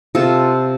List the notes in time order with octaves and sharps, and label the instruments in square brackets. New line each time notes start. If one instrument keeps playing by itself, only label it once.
[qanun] C3 F4 A4